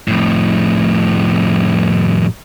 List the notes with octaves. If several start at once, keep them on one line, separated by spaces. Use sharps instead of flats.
F2 A2